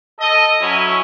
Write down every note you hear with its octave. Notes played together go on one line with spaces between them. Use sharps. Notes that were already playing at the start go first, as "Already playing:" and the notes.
A4 D#5
F#3 C#4 E4